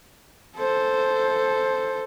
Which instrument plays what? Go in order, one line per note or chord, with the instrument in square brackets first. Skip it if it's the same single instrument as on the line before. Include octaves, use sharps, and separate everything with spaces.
[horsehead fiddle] A4 C5